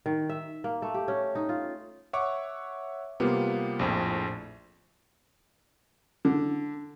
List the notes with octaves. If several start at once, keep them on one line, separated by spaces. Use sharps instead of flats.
D#3
E5
A#3
A3
G4
C#4
D#4
F4
C#5 E5 F#5 C#6 D6
C3 G3 A#3 B3 F4 G4
A#1 F2 A2
D3